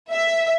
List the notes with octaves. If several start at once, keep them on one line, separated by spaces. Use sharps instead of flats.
E5